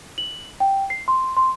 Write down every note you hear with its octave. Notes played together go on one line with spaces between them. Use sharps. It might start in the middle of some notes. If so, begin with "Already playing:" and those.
F#7
G5
C7
C6
C6